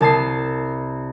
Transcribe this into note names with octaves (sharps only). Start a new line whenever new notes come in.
C2 A5 D#6 C7